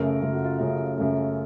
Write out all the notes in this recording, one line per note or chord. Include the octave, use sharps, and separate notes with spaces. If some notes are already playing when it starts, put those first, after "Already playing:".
Already playing: F#2 C#3 A3 A#4
F#2 C#3 A3 F4
F#4
F4
F#2 C#3 A3 F4
F#2 C#3 A3